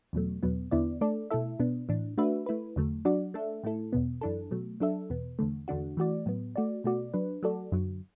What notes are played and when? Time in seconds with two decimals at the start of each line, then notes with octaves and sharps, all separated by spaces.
0.13 E2 B2 F#3 A3
0.43 E2 B2 F#3 B3
0.71 E2 D3 B3 E4 D5
1.01 A3 D4 A4 D5
1.30 B2 A3 E4 A4 E5
1.60 B2 B3 D4
1.89 A2 E3 D4
2.17 A3 D4 F#4 B4 E5
2.46 A3 E4 B4
2.76 E2 D3 F#3 A3
3.05 F#3 D4 F#4 D5
3.34 A3 D4 A4 E5
3.63 A2 A3 E4 A4
3.93 E2 B2 B3
4.21 F#2 E3 D4 A4
4.51 B2 F#3 A3
4.80 F#3 D4 A4 E5
5.10 E2 B2 B3
5.39 E2 D3 A3
5.68 E2 D3 A3 D4 F#4
5.97 E3 A3 F#4 D5
6.26 A2 F#3 B3
6.56 A3 F#4 D5
6.84 B2 A3 F#4 D5
7.14 F#3 D4 B4
7.43 F#3 A3 F#4 A4 D5
7.72 F#2 D3 F#3